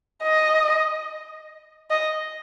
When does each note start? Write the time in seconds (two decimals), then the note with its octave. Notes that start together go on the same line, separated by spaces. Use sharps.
0.23 D#5
1.90 D#5